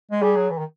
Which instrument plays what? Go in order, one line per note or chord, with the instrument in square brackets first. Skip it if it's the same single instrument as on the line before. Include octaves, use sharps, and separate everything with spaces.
[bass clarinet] G#3
[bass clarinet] G3 [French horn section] G#4
[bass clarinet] F#3
E3
D#3